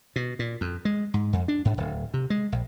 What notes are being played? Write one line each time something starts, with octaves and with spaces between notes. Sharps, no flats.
B2
A#2
F2
G#3
G#2
F2
D4
G#2
D1
C3
G#3
A#1